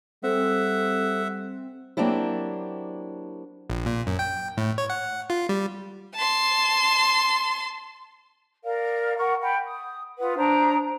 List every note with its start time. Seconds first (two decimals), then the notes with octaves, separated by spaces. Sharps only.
0.23 G3 C4 A4 E5 F#5
1.97 F#3 A#3 C4 D4 E4 G4
3.70 A#1
3.86 A#2
4.07 F#2
4.19 G5
4.57 A2
4.78 C#5
4.90 F#5
5.30 F4
5.49 G3
6.15 A5 C6
8.64 A#4 D5 F5
9.17 A#4 F#5 C#6
9.41 F#5 G5 B5
9.66 D#6
10.19 F4 B4 F#5 D#6
10.36 D4 C5 A#5 D#6